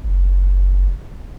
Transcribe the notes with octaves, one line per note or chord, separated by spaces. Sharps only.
F#1